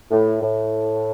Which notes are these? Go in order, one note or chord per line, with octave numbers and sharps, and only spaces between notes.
A2
A2